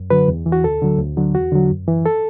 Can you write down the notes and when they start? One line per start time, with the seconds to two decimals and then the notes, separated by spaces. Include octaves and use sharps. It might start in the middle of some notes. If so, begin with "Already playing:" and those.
Already playing: F#2
0.10 D3 F#3 B4
0.28 E2
0.46 E3
0.52 F#4
0.64 D2 A4
0.82 D3 F#3
0.99 D2
1.17 D3 F#3
1.35 E2 F#4
1.52 D3 F#3
1.71 F#2
1.88 E3
2.06 A4